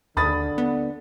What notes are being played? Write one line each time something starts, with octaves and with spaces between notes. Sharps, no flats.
D#2 D3 B5 D#6 A6
B3